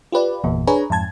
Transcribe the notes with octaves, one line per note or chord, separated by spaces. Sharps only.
F4 G4 B4 D5
G1 E2 A#2
D4 G#4 B4 C#5 G#5 A#5
F2 G#2 A5 G#6